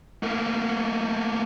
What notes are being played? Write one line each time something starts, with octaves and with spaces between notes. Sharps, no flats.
A3 A#3